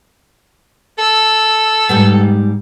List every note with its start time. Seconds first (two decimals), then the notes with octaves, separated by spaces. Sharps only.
0.98 A4 E6
1.89 G#2 G3 B3